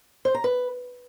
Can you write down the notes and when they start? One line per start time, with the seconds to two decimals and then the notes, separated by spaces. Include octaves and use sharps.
0.25 C5
0.34 A#5
0.44 B4